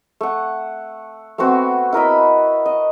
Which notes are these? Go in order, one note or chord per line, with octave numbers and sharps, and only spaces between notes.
A3 F#5
A3 B3 C4 F#4
E4 A#4 D#5 B5
D#5